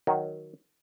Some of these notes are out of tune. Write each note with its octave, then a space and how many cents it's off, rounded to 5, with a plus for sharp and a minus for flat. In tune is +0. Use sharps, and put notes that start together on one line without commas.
D#3 +0 F#3 +0